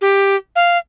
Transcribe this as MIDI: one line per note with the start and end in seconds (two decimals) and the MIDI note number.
0.01 0.36 67
0.56 0.78 77